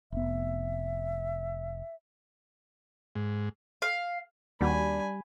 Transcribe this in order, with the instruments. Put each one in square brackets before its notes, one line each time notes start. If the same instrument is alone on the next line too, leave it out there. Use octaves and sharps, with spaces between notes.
[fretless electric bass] F1 B3 [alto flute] E5
[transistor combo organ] G#2
[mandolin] F5
[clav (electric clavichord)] D#2 F#4 [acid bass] G3 [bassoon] D4 [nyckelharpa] G#5 B5